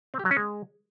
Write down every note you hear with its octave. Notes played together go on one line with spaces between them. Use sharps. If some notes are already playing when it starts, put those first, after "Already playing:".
C4
G4
F#3
C#4
G#3